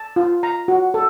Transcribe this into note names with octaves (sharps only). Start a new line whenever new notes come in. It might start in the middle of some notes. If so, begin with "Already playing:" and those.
Already playing: A5
F4
A#5
F#4
A4